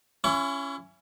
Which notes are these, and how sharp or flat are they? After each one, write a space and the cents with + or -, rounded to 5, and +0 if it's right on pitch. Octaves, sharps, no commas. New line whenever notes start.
C#4 +0 E4 +35 C#6 +45